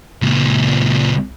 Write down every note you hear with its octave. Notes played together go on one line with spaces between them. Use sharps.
C#2 A#2